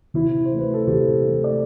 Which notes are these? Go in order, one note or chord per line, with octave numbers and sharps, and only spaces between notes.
C3 E4
C5
E3 A3
B4
A4
C3 G4
E3 A3
D5